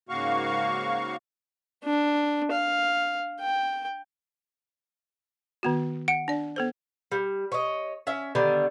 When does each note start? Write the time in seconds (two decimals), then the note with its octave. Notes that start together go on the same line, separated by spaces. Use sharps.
0.09 G#2 C#3 A#3 F#4 F5 C#6
1.84 D4
2.51 F5
3.40 G5
5.63 D#3 B3 F#4
6.08 F#5 D7
6.28 D4 D5
6.56 B3 A4 C5
7.12 G3
7.52 C#5 D#5
8.07 C#4 E5
8.35 D3 D#3 G3 B3